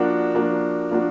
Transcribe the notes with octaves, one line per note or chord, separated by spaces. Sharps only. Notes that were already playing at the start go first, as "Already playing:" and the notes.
Already playing: F3 A#3 D4 F#4
F3 A#3 D4 F#4
F3 A#3 D4 F#4